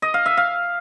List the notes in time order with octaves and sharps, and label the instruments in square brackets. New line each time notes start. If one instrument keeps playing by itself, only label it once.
[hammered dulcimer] D#5
F5
E5
F5